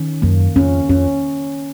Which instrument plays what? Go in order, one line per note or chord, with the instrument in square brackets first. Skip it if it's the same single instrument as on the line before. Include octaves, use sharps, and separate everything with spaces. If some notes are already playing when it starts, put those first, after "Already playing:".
Already playing: [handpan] D#3 C#4
[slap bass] F#2 [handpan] A#3
[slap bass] F2 [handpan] C#4
[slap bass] F2 [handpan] C#4